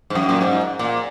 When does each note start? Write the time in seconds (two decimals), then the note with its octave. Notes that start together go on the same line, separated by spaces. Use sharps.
0.10 G#2
0.15 F#2
0.29 A#2
0.41 G#2
0.79 A#2